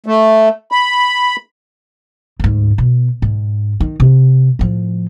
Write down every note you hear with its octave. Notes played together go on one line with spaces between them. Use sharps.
A3
B5
D2 G#2
B2
G#2
D#3
C3
A2 F3